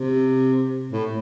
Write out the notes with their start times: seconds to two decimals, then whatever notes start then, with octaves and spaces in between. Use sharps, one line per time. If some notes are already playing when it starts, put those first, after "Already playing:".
Already playing: C3
0.92 A2